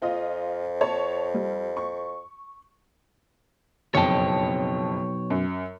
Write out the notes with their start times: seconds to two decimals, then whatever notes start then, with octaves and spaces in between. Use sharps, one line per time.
0.02 F2 F4 D#5
0.81 C#5 A5
1.34 G3
1.77 C#6
3.95 F#1 B1 F2 C#5 G5 A5
5.30 F#2